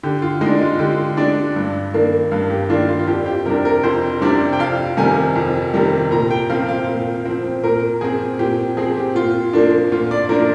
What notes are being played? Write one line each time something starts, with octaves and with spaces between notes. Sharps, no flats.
D3 G4
F4
G#3 D4 D#4
F4
D3 G4
G#3 D4 D5
G2
D#3 A#3 D4
G2 F5
G4
D#3 A#3 D4 F4
F4
F4
F2 G4
G4
C3 G3 D4 A#4
A#4
F2 C5
C3 G3 D4 D5
G5
F2 F5
C3 D#3 G3 G#5
F2
C3 D#3 G3
A#2 A#5
G5
F3 C4 F5
F5
A#2
F3 C4
A#2 A#4
F3 C4 G#4
A#2 G4
F3 C4 G#4
G4
A#2 F4
F3 A#3 D4
A#2 F4
D5
F3 A#3 D4 A#4